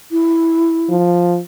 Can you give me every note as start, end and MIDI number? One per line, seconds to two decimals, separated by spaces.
0.12 0.95 64
0.90 1.40 53